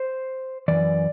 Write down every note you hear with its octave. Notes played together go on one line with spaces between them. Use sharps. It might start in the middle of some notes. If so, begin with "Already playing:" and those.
Already playing: C5
F#2 E3 D5